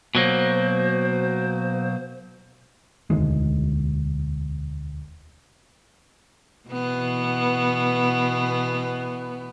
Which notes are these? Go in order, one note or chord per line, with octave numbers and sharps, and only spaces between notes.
B2 F#3 A#3 C5
E1 D2 D#3 G#3
B2 E3 B3